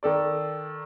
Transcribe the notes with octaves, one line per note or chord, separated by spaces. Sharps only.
D#3 A4 D5